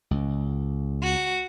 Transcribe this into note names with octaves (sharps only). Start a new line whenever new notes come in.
C#2
F#4